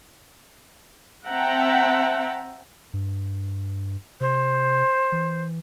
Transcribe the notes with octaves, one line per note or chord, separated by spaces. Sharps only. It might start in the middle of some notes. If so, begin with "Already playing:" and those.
C4 E5 F#5 G5 A5 A#5
G2
C3 C5
E3